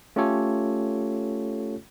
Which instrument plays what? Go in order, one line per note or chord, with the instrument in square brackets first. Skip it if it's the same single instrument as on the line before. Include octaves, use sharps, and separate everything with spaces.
[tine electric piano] A3 C#4 F4 G4 A4 C#5